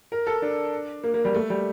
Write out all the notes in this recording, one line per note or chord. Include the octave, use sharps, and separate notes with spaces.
A#4
A4
D4
A#3
A#3
G3
A3
G3